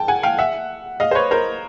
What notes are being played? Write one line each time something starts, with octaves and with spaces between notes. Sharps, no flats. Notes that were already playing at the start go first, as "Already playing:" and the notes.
Already playing: G5 A5
F#5 G#5
F5 G5
E5 F#5
D#5 F5
C5
B4 C#5
A#4 C5